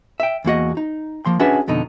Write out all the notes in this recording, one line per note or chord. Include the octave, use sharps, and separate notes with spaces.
E5 G5
E2 A#3 F#4 D#5
D#4
F3 A#3 C6
C#4 D4 F#4 G#4 B4 E5
F2 B2 D3 D#4